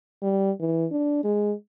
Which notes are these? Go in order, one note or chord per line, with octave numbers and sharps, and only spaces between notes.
G3
E3
D4
G#3